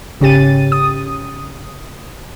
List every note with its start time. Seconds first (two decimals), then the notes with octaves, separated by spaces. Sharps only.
0.21 G#1 C#3 C#4 G4 A6 D#7
0.72 D#6